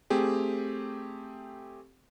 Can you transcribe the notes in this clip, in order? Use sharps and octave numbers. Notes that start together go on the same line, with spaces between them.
A3 C4 G4 G#4